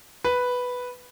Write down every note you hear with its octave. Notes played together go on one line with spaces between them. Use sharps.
B4